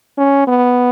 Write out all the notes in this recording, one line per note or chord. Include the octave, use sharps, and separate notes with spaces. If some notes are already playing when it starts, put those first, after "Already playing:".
C#4
B3